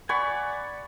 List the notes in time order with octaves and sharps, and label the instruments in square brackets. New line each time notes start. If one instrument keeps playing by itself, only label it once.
[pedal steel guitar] D5 G#5 [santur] F#5 B5 C#6